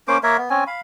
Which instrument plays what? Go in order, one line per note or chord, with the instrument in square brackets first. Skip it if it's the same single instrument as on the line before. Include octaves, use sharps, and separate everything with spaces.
[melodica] A#3 C#4 C5 D6
A#3 A#4 C#5 E5
B3
C4 C#4 G#5
F5 B5